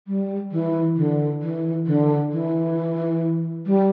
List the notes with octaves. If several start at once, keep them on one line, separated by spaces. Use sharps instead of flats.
G3
E3
D3
E3
D3
E3
G3